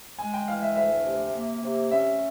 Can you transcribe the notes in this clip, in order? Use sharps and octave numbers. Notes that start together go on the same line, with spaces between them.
G#3 G#5
G5
E3 F5
E5
D2 E5
C3
A#3
C3
C#4 E5